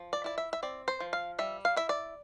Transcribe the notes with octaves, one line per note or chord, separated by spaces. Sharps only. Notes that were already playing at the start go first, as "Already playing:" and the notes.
Already playing: F3
D5
E4 D5
E5
E5
C4 D5
C5
F3
F5
G3 E5
F5
E4 E5
D5